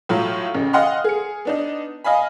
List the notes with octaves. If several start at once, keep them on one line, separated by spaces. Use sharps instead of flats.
A2 F#3 F4
A1 C#3
D#5 F5 F#5 C6 F6
G#4 C#7
B3 D4 D#4
D#5 F5 G#5 B5